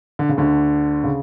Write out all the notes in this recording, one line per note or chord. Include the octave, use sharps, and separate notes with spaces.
D3
C#3
D2 D3
C#3